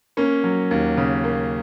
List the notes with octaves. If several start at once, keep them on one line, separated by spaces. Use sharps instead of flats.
A#3 C#4
F#3
D#2
C#3
A#3